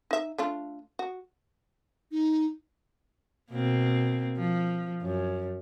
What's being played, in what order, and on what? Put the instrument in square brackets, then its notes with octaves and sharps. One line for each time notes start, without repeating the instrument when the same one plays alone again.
[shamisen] D#4 E5
A3 D4 F4
F#4
[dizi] D#4
[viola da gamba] B2 A#3 C4
F3
F#2